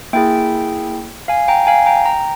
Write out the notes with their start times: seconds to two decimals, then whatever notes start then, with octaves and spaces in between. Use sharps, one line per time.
0.13 A#3 E4 G#4 E5 G5
1.28 F5 G#5
1.48 G5 A#5
1.67 F5 G#5
1.86 G5 A#5
2.06 G5 A#5